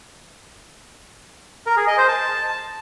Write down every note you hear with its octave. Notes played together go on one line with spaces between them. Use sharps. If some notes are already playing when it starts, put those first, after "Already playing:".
A#4
G#4
D#5
C5
A5